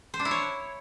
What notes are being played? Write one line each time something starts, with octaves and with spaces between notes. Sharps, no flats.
C5
D4
E4
C#5